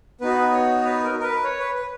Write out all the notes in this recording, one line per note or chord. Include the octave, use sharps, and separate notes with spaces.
B3 D#4 F#4 B4
C#5
B4
A#4
A#4
B4
C#5
B4
B4